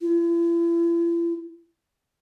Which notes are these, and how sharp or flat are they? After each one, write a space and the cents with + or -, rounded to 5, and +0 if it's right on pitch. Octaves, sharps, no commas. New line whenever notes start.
E4 +45